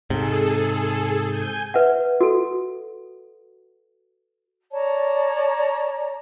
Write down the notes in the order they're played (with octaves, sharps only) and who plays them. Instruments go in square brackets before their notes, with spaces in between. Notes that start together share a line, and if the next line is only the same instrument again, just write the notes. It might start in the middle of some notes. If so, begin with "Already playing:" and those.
[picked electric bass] G#2 C3 [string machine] G#4 A4
[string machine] G#5 G6
[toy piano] B4 E5 F#5
F#4 A4
[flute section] C#5 D5 A5 A#5